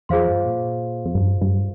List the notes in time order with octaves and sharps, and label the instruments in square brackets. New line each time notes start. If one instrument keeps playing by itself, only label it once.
[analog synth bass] F2 [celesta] F4 G#4 C5 F5 C6
[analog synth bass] G2
A#2
F2
G2
G2